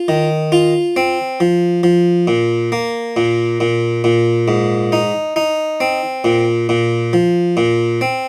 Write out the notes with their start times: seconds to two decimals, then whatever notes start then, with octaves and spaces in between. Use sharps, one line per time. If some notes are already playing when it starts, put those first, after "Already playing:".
Already playing: F4
0.08 D#3
0.52 F4
0.96 C4
1.40 F3
1.83 F3
2.27 A#2
2.72 A#3
3.16 A#2
3.60 A#2
4.04 A#2
4.48 G#2
4.92 D#4
5.36 D#4
5.81 C4
6.24 A#2
6.69 A#2
7.13 F3
7.57 A#2
8.01 C4